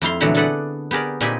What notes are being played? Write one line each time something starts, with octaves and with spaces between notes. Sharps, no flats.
F2 E4 F5 C6
A#2 D3 E3 F#3 A3 B3
D4 G#4 A4 B4 D5 F#5
B3 G4 G#4 A#4 D5
A#2 C4 D#4 G4 G#5 B5